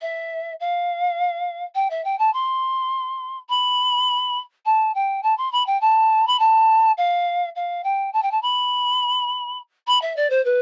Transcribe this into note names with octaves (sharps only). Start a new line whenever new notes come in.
E5
F5
G5
E5
G5
A5
C6
B5
A5
G5
A5
C6
B5
G5
A5
B5
A5
F5
F5
G5
A5
G5
A5
B5
B5
E5
D5
C5
B4